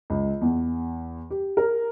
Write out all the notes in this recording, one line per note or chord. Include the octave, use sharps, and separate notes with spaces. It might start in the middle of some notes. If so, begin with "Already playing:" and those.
C#2
E2
G4
A#4